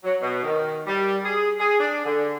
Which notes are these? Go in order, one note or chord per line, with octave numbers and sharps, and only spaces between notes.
F#3
B2
D#3
G3
G#4
G#4
D4
D3